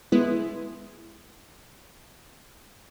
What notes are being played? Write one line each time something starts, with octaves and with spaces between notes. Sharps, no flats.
G#3 B3 E4